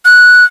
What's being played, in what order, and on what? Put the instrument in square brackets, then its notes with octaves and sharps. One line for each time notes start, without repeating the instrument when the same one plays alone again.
[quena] F#6